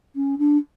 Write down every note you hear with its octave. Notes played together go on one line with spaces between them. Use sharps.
C#4
D4